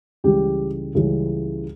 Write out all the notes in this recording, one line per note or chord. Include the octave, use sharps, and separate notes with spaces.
C#2 C#3 E3 G3 G4
C#2 C#3 E3 G3